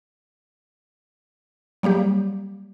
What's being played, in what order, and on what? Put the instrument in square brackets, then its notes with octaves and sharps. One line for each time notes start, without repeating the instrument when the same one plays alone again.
[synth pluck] F#3 G3 A#3 G4